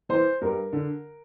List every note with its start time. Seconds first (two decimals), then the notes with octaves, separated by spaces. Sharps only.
0.09 E3 C5
0.41 G2 A#4
0.73 D3